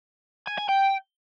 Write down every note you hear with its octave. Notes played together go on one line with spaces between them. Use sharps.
G#5
G#5
G5